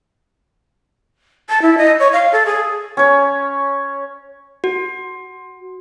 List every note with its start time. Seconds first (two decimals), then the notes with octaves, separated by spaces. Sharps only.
1.49 A5
1.62 E4
1.78 D#5
1.99 C#5
2.13 F5
2.32 A4
2.46 G#4
2.97 C#4 C#5
4.64 F#4